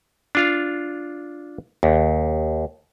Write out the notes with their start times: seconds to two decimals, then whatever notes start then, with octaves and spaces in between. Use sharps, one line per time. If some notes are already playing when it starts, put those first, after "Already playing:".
0.35 D4 F4 F5
1.83 D#2